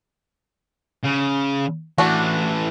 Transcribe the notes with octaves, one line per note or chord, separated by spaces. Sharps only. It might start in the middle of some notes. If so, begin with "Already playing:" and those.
C#3
E3 A3 D4 F#4